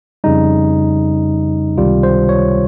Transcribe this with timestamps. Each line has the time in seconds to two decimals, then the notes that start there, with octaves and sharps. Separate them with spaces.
0.24 F2 C#3 G3 D#4
1.78 C#2 C3 D#3 G3 F4
2.03 C5
2.29 C#5